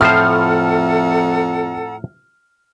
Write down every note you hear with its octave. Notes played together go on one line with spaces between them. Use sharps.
F2 A2 F3 A4 C5 F#5 A#5 F6